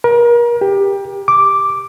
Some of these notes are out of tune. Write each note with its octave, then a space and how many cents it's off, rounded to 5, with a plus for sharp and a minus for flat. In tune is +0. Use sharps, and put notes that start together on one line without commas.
A#4 +35
G4 +15
D6 +0